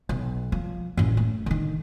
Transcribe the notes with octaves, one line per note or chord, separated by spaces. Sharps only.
B1
F3
A1 F#2
A3
D3 D#3